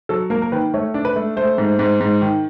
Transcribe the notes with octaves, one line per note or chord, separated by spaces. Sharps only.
F#3 A4
A#3 A#4
A#4
D#3 B4
A3 C#5
D4
B4
A3
A3 C5
G#2
G#2
G#2
D#3